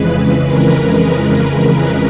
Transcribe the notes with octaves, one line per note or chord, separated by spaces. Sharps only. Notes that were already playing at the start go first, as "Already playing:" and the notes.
Already playing: F2 C#3 E3 G#3 B4
A#4